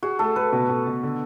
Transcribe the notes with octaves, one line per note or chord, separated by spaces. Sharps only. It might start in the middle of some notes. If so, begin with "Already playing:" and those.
F#4 G#4
A3 A4
A3 B4
B2
B2
B2
D3